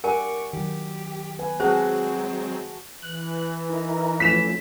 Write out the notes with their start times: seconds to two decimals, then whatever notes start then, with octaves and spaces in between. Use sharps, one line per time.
0.04 G4 A#4 D5 F#5 G#5 C#6 D6
0.53 D#3 F#3 G4
1.39 B4 G#5
1.60 F#3 G#3 C4 F#4 G#4 C5 A5
3.02 E3 F#6
3.69 D#4 E4 A#4
4.20 F3 A3 C#4 B6 E7